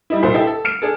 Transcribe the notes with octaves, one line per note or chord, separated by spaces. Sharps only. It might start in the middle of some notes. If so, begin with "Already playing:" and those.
G3 D#4 E4
C2 A#2 C5
E4 G4 A4 D#5 E5
A4
F6 C#7 D7
D4 G#4 A4